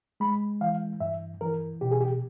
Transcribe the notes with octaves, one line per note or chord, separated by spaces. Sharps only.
G#3 B5
E3 F5
G2 E5
E3 A#4
B2 G4
G#4
G4